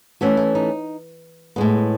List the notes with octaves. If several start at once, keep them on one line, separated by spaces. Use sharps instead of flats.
E3 A3 C#4 F#4
E4
D#4
A2 G#3 B3